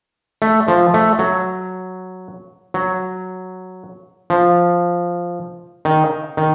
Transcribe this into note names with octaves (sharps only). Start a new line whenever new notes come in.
A3
F3
A3
F#3
F#3
F3
D#3
D#3